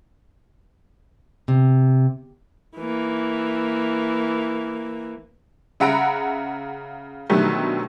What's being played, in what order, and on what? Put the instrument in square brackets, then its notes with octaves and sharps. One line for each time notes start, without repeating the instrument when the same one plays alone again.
[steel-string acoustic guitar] C3
[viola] E3 A#3
[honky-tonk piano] C#3 E5 F#5 A#5 B5 D7
B2 D3 D#3 F#3 G3 A3